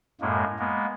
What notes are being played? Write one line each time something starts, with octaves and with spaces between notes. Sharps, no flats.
F#2 A2 G#3 A#3
G#3 A#3 B3